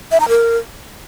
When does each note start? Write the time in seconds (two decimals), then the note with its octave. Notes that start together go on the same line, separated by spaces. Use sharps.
0.11 E5
0.20 A#5
0.29 A#4